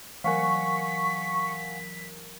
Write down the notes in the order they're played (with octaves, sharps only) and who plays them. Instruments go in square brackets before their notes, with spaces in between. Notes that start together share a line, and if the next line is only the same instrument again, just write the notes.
[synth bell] E3 F#3 A#4 [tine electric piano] F5 F#5 G#5 [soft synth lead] C#6 [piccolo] B6